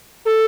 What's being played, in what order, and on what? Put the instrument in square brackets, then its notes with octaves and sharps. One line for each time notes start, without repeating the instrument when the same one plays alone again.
[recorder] A4